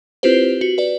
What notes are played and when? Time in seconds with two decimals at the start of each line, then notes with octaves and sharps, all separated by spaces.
0.23 C4 E4 F4 G4 B4 C5
0.61 F#4
0.78 B4 D5